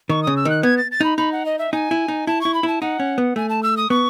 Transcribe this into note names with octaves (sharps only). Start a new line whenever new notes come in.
D#3 C#6
C#3 D#6
E6
D#3 F#6
B3 G#6
A6
A6
D#4 B5
D#4 B5
F#5
D#5
E5
D#4 G#5
E4
D#4
E4 A5
E4 C#6
B5
E4 A5
D#4 F#5
C#4
B3
A3 G#5
A5
E6
D#6
B3 C#6